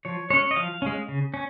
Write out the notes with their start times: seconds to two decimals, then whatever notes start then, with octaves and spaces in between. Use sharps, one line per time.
0.05 F3 C#5
0.30 G#3 C#4 C#5
0.51 D#5
0.56 F3 F5
0.82 G#3 C#4
1.08 C#3
1.34 C#4